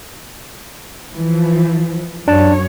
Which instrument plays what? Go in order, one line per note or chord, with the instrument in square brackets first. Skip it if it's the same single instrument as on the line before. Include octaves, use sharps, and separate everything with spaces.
[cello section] E3 F3
[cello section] F#2 C#5 [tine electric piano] D4 A5